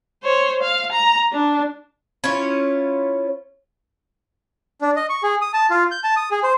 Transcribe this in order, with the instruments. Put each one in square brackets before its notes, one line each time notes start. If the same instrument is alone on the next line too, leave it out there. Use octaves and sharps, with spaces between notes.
[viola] C5 C#5
F5
A#5
D4
[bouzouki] C#4 E4 F4 C#5
[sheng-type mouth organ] D4
D#5
C#6
G#4
D#6
A5
F4
G6
A5
D#6
G#4
C5